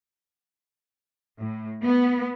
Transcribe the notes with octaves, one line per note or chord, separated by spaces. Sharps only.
A2
B3